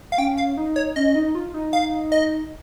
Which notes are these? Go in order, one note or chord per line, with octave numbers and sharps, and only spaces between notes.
F5
C#4 G5
F5
D#4
C#5
C#4 D#5
D#4
F4
D#4
F5
D#5